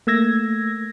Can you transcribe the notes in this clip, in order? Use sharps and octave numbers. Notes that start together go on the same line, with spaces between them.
A3 A#3 E6 G#6 A#6